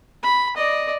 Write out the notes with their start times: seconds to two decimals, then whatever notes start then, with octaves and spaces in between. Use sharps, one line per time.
0.23 B5
0.57 D5 D#5